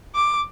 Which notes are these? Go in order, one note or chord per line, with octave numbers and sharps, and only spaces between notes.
D6